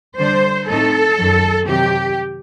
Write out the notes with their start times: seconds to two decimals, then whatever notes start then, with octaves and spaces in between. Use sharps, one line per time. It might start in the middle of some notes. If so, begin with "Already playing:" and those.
0.17 D3 G3 D4 C5
0.68 A2 A3 C4 D#4 A4
1.17 F#2 D#3 F#3
1.68 C3 D#3 F#3 G4